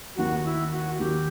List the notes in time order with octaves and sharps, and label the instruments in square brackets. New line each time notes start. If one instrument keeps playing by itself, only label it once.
[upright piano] D#2 D#3 F#3 [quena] F#4
[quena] E4
F#4
[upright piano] D#2 D#3 F#3 [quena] G4